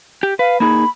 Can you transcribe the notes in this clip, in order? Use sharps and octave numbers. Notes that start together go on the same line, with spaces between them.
G4
B4 F5
A#3 D#4 G#4 B5